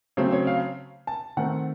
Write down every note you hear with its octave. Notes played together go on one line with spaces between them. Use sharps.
C#3 F#3 A3 C4
C#5
F5
A5
D#3 A3 C4 F#5